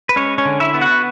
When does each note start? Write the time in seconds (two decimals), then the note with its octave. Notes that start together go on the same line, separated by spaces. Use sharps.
0.09 B4
0.16 G#3 C#4 C#5
0.38 C#4 C#5
0.45 D3
0.60 E4 E5
0.74 B3
0.81 F#4 F#5